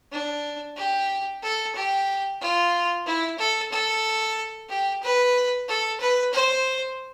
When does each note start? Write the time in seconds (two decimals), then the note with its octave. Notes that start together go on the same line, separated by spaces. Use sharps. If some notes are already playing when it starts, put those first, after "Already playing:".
0.12 D4
0.77 G4
1.42 A4
1.75 G4
2.41 F4
3.06 E4
3.38 A4
3.72 A4
4.69 G4
5.03 B4
5.68 A4
6.00 B4
6.33 C5